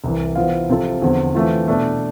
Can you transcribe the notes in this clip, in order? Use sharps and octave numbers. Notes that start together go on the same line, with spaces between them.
C2 C3 E3
E3 B3 F4 C5 F5
C3 F3 C4 F4 A4
E2 D3 F3 C4
E3 A3 C4 F4
B2 A3 D4